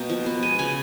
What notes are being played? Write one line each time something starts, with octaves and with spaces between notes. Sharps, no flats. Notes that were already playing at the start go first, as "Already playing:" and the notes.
Already playing: B2 A#3 G5
F3
B3
G#3 G#5
C#3 G#5